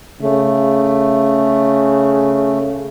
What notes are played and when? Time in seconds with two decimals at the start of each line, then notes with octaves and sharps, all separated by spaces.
0.22 C#3 A3